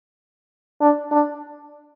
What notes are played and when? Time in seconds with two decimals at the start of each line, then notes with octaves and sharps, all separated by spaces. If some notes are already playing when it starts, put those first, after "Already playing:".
0.81 D4
1.11 D4